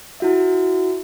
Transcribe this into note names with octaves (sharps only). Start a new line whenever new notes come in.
E4 F#4 E5